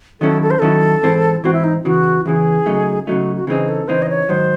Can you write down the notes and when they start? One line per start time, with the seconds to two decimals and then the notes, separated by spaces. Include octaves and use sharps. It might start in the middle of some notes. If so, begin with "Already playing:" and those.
0.21 D#3 F#3 C#4 E4 A4
0.42 A4
0.51 C5
0.59 D#3 F#3 C#4 E4 A4
1.03 G#2 E3 C4
1.44 G#2 E3 C4 F#4
1.53 E4
1.64 D#4
1.84 E2 C#3 E3 F#4
2.26 E2 C#3 E3 G#4
2.66 C#3 F#3 A3 D#4
3.07 C#3 F#3 A3 D#4 F#4
3.36 F#4
3.47 C#3 E3 C4 D#4 G#4
3.68 A4
3.88 C#3 E3 C4 D#4 C5
4.02 D#5
4.10 C#5
4.29 G#2 D#3 F#3 C5